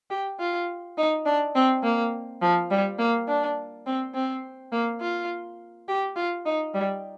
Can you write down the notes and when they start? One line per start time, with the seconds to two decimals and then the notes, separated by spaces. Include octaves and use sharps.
0.10 G4
0.40 F4
0.98 D#4
1.25 D4
1.55 C4
1.83 A#3
2.42 F3
2.71 G3
2.99 A#3
3.28 D4
3.86 C4
4.14 C4
4.72 A#3
5.01 F4
5.88 G4
6.16 F4
6.46 D#4
6.74 G3